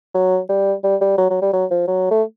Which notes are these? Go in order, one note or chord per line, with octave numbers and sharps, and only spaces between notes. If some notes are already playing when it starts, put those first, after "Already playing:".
F#3
G3
G3
G3
F#3
F#3
G3
F#3
F3
F#3
A3